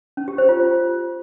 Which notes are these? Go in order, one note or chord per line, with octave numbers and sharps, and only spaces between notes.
C#4
G4
C5
F4